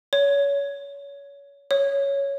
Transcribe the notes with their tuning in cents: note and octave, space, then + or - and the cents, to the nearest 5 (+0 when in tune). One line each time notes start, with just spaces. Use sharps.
C#5 +30
C#5 +5